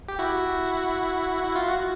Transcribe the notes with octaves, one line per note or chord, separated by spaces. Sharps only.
G4
E4 F#4
E4
F4
F#4